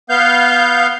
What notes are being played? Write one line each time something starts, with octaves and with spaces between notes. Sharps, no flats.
B3 F5 G6